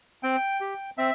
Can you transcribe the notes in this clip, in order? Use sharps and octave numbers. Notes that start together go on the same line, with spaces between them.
C4 G5
G4
C4 E5